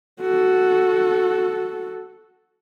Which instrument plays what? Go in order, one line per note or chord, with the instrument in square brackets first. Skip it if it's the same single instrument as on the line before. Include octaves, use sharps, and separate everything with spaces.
[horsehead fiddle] F#4 A4